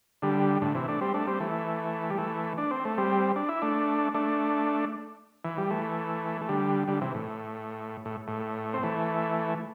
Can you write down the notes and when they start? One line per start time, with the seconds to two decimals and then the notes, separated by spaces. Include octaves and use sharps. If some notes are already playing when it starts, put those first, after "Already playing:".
0.22 D3 G3
0.62 A2 D3
0.75 C3 E3
0.88 A3 D4
1.01 G3 C4
1.14 A3 D4
1.27 G3 C4
1.40 E3 A3
2.10 G3
2.18 E3 A3
2.58 D4
2.71 C4
2.85 A3
2.97 G3 C4
3.36 D4
3.49 E4
3.62 A3 D4
4.14 A3 D4
5.45 E3
5.58 G3
5.70 E3 A3
6.41 A3
6.49 D3 G3
6.88 D3 G3
7.01 C3 E3
7.14 A2
8.05 A2
8.28 A2
8.74 C4
8.83 E3 A3